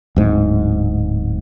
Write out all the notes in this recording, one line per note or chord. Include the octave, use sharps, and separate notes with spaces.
D1 G#2